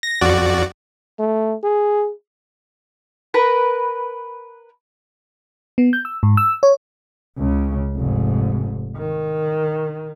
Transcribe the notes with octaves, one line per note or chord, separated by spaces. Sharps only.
A#6
F2 F#4 D5
A3
G#4
A#4 B4 B5
B3
G6
E6
G#2
E6
C#5
C#2 C#3
F1 G#2
D#3